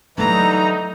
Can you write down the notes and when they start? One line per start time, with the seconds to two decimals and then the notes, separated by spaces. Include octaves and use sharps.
0.18 G2 D3 E3 F#3 A3 D#4 A#5